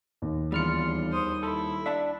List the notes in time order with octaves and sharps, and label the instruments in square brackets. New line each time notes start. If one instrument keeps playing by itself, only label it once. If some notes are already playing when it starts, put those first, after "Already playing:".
[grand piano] D#2
[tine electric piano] E2 F6 C#7 [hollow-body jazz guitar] G3 D4 [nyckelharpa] F4
[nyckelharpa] C5 D#6
[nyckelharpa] E4 [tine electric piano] A4
[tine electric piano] D4 [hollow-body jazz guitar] E5 F#5 A5